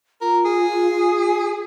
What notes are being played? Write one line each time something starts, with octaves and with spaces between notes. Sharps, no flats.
F4 A#4
G#4